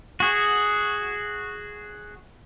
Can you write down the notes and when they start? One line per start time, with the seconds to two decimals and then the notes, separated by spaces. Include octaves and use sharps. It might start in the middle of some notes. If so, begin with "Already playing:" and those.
0.20 F#4 G#4